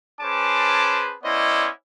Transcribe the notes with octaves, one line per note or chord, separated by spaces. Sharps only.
C#4 G#4 B4 C5 A5 D6
B3 C#4 E4 C5 D5 D#5